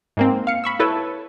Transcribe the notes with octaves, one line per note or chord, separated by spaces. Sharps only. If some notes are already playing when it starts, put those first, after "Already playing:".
G#2 A#3 C4
F5 C#7
B5 C#6 E6
E4 A4 B4 C#5